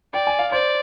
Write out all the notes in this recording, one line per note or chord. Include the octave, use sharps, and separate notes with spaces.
D5 G5
G#5
F5
C5 D5